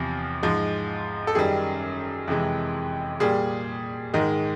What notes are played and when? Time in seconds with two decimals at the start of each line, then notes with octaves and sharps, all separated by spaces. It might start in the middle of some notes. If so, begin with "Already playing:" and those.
Already playing: E2 C3 F3
0.43 G#2 F3 G#3
1.27 A4
1.35 F#2 D#3 G3 G#4
2.28 F2 C3 E3 G#3
3.20 A#2 G3 G#4
4.14 G#2 D#3 G#3